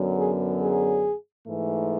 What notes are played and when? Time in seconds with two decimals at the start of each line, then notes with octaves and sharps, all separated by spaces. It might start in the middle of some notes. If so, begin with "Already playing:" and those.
Already playing: F#2 D3 F#3 B3
0.15 G#4
0.59 G#4
1.47 G#2 E3 A3